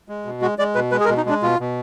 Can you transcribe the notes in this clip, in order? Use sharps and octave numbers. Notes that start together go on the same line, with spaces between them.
G#3
B2
G#3 F#4
G#3 D5
B2 B4
G#3 B4
G#4
A#4
B2
D#4
G#3 D4
B2 F4
B2